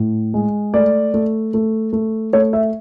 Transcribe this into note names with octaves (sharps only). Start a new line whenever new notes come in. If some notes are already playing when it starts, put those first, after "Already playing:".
Already playing: A2
G#3
A3 D5
A3
A3
A3
A3 C#5
E5